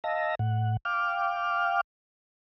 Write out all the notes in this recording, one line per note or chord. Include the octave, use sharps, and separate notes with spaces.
D#5 F5 A5 E6 A#6
A2 F#5
F5 G5 D6 F6